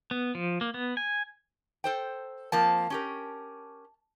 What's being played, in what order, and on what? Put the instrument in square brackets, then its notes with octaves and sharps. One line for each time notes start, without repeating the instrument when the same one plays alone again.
[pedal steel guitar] B3
F3
A#3
B3
G#5
[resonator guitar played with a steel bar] A4 C5 G5
[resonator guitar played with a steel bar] F3 A#3 C4 [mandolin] A5
[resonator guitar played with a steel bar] C#4 G4 A#4